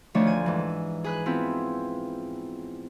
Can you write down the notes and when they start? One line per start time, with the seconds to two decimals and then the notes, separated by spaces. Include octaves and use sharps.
0.14 D2 D#3 F3 A3 D4 C#5
0.27 G#5
0.46 G#2 E3
1.04 G#4 B4 F#6
1.26 B3 C4 E4 F4 B4